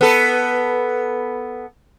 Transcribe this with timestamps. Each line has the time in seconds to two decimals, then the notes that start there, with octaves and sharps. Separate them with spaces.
0.01 B3 A4